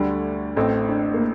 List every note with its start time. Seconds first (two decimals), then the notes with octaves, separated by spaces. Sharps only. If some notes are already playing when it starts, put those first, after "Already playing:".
Already playing: D2 D3 G3 D4
0.56 A1 A2 A3 C4
0.89 D4
1.14 A#3